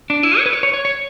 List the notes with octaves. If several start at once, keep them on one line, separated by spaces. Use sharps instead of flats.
D4
E4
C#5
B4
C#5
C#5
C#5
C#5